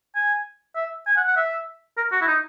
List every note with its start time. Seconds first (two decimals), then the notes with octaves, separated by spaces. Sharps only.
0.15 G#5
0.75 E5
1.07 G#5
1.17 F#5
1.27 F#5
1.36 E5
1.97 A#4
2.12 F#4
2.21 E4
2.28 D#4